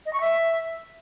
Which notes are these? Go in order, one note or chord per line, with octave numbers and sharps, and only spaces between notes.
D#5
C#6
E5